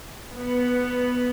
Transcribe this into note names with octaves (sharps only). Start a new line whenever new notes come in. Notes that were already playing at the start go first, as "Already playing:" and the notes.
B3